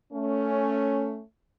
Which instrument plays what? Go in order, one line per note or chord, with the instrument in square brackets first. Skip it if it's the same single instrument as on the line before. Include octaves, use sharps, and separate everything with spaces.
[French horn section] A3 C#4